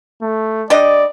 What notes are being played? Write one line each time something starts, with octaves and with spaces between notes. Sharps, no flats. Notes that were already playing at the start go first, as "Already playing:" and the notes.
A3
G3 D4 D5 D#5